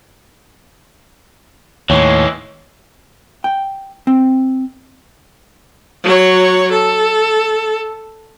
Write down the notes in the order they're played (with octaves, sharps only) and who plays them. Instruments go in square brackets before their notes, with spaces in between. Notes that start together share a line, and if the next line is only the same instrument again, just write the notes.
[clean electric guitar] D#2 A2 [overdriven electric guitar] E3 G#3 [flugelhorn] C#5
[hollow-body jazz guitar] G5
C4
[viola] F#3 C#5
A4